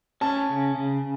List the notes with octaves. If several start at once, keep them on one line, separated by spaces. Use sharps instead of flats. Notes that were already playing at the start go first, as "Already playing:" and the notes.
C#4 A5
C#3
C#3